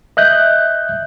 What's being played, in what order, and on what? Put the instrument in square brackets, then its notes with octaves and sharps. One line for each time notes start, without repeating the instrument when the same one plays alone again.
[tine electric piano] D#5 E5 F#6 G6